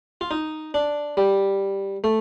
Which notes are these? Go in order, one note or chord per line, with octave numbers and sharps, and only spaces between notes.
F4
D#4
D4
G3
A3